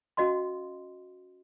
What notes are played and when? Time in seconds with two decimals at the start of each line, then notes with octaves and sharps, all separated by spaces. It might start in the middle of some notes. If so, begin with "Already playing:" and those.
0.17 C#4 F#4 D#5 F5 C6